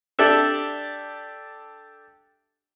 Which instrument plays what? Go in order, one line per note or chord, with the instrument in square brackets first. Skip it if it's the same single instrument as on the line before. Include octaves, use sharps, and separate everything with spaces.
[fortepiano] D4 G4 A4 D5 E5